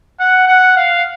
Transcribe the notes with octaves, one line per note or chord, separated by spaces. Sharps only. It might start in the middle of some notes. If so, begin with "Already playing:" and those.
F#5
F#5
F5